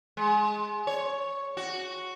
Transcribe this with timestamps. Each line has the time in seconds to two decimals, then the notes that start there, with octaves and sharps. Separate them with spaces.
0.17 G#3
0.87 C#5
1.57 F#4